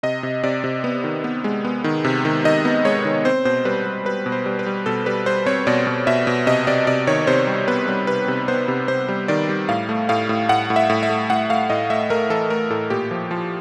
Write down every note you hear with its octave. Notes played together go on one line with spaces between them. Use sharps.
C3 D#5
C3
C3 D5
C3
B3
D#3
B3
G#3
B3
D#3
C3
D#3
D#3 D#5
B3
G#3 C#5
D#3
C4 C5
B2 C5
G3 B4
G3
G3 B4
B2
C5
G3
B4
G3
B2 A4
G3 B4
G3 C5
C4 C#5
B2 D5
B2
B2 E5
B2
C3 D#5
C3 D5
C3 D5
D#3 C#5
C3 C5
G3
B3 B4
G3
C3 B4
C3
B3 C5
C3
C3 C5
G3
D#3 D5
G3
A2 F5
A3
A2 F5
A2
A2 F#5
A2
E5
A2
E5
A3
A2 F#5
A3 F5
A2 D#5
A3 E5
A3 A#4
E3 A4
A3 A#4
A2 A4
A#2 G4
F3
F3